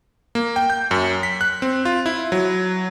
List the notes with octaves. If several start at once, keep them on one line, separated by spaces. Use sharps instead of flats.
A#3
G5
G6
F#2
B6
F#6
C4
F4
E4
F#3